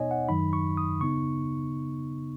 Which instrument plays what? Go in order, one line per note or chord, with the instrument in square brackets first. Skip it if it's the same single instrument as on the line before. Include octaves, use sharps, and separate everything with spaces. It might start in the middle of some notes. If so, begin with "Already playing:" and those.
Already playing: [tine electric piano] B2 B3 D#4 C#5 D#5 G#5
F#5
F#2 D#3 F#3 D#4 B5
C#6
D#6
C#3 B3 D#4 C#6